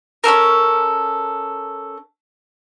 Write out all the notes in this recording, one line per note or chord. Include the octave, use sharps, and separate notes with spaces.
C#4 G4 A4 A#4